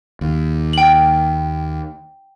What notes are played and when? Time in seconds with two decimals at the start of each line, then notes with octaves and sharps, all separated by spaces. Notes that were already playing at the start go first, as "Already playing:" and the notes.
0.21 D#2
0.73 G5 F#7